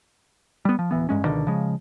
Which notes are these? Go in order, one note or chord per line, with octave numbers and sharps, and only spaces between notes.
G3 B3
F3
D1 E3 B3
A1 G2 G#3 C#4
C#2 B2 D3 D#3
C#3 F3 G#3